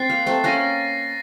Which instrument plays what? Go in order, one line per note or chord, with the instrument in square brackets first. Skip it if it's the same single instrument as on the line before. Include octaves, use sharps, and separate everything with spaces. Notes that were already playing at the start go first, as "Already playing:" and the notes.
Already playing: [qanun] C4 [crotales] F#6 A6 C7
[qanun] A#3
A3 C4
[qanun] A#3 C#4 [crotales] F#6 A#6 D#7